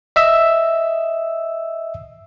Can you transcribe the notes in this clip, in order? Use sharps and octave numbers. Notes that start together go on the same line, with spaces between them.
D#5 E5 E6